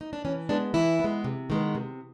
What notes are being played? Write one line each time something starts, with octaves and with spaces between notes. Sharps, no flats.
D#4
D4
E3 C#4
G#3 B3 D4
E3 E4
G#3 B3
C3
D#3 G#3 B3
C3